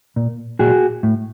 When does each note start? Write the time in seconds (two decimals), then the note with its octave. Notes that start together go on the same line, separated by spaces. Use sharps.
0.16 A#2
0.59 A#2 F#4 G#4
1.03 A2